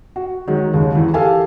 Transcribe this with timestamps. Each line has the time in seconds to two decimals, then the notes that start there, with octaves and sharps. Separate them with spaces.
0.16 F#4
0.47 D#3 F#3 G#3
0.74 D#2 C#3
0.95 E2 E3
1.14 G4 A4 F5 G#5